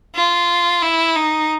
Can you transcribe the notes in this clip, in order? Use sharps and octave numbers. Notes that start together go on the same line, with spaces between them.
F4
E4
D#4